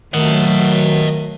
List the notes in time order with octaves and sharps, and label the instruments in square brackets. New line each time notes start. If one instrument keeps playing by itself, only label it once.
[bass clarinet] D#3 [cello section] F#3 [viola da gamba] A3 [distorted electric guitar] D#5 F#5